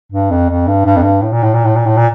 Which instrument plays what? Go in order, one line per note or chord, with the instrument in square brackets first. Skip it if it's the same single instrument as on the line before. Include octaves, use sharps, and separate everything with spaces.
[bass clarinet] G2
F2
F2
G2
G2
F2
G2
A2
A#2
A2
A#2
A2
A#2
A2
A#2